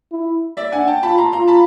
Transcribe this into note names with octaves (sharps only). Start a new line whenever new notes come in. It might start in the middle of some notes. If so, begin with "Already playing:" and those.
E4
D5 E5
D4 F#5 G#5
G5 A5
F4 A5 B5
A#5 C6
F4 A#5 C6
A5 B5